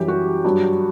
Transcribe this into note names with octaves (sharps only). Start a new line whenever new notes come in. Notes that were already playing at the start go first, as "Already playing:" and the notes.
Already playing: F#2 E3 G3 G4
F#4
G2 F#3